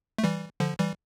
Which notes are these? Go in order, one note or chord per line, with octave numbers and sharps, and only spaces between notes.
A3
E3 G3
D3 F3
E3 G3